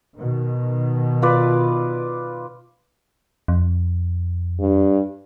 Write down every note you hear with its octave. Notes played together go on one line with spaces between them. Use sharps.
B2 D#3
F4 B4 D5
F2
G2